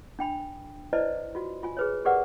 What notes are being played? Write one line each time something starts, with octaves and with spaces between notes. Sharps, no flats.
D4 G5 B5
E4 B4 C5 D5 D#5 A5
F4 F#4
F4 G#5
G#4 B4 C#5
G4 G#4 A#4 B4 D5 F#5